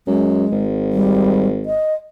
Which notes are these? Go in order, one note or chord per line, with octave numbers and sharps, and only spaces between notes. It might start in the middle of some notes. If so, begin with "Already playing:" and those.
F#2 G#3
G#1
G3
D#5